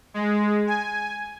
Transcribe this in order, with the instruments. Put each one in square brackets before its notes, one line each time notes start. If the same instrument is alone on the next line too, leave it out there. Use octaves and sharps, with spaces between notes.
[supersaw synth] G#3
G#5